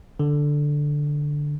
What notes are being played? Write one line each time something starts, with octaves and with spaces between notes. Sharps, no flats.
D3